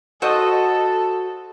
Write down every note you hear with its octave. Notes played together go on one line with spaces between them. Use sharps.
F#4 A4 C5 D#5